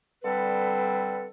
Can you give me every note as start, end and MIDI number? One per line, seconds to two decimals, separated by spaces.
0.23 1.26 50
0.23 1.26 55
0.23 1.26 60
0.23 1.26 69
0.23 1.26 71